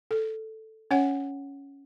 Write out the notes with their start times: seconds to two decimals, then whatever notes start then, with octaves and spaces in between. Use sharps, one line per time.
0.11 A4
0.91 C#4 C#5 F#5